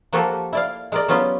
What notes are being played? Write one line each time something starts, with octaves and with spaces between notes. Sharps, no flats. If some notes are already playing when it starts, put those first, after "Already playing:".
F3 A#3 F#4 G4 A4
E4 D5 F5
G#3 A#4 D5
F#3 B3 C#4 F4 G4